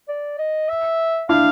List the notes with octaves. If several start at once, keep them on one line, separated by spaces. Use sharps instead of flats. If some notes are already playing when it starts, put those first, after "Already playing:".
D5
D#5
E5
D4 E4 F5